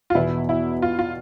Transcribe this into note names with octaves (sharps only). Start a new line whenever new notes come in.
F4
E2 B2 B3 E4
E4
F4
F4